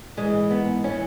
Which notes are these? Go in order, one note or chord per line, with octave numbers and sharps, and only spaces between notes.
G#2 E3 G#3
B3
E3 C#4